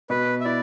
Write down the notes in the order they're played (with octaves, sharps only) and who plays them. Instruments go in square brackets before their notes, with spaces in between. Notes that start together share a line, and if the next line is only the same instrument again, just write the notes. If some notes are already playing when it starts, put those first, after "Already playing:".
[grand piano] B2 [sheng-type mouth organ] B4
[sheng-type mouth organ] E5
[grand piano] E4 [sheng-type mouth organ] D5